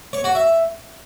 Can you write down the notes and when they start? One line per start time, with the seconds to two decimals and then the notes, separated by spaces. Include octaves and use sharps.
0.13 C#5
0.24 F#4
0.35 E5